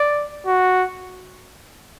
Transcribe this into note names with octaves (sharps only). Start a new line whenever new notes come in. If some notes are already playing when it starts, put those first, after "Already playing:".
Already playing: D5
F#4